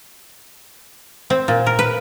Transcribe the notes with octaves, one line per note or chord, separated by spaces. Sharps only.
C4
A#2
A#4
B4